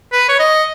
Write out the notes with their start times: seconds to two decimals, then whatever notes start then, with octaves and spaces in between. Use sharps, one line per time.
0.12 B4
0.29 C#5
0.39 D#5